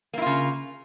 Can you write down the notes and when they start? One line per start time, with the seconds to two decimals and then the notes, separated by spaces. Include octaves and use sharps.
0.14 A#3
0.18 E4
0.22 F4
0.26 C#3